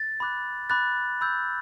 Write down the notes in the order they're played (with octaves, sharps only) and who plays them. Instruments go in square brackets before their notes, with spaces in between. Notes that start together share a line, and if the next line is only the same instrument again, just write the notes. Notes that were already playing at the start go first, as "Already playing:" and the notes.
Already playing: [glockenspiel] A6
B5 D6 F#6
B5 D6 F#6 A6
B5 E6 G6